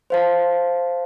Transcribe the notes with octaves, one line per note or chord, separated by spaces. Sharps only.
C5 F5 A5